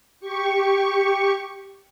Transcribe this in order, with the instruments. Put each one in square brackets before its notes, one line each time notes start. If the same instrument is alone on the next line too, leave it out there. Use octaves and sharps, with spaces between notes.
[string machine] G4 C#6